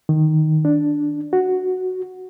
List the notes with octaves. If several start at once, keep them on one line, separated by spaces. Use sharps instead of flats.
D#3
D4
F#4